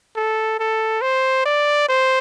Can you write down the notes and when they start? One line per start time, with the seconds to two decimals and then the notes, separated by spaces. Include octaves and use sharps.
0.16 A4
0.59 A4
1.02 C5
1.45 D5
1.89 C5